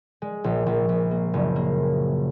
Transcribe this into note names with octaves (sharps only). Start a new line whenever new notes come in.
G#3
A#1
A#1
A#1
A#3
F#1
A#3